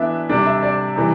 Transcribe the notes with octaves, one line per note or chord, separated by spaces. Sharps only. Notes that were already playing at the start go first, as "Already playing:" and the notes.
Already playing: E3 B3 D4 E5
C3 G3 D4
E5
D5
C3 E3 G3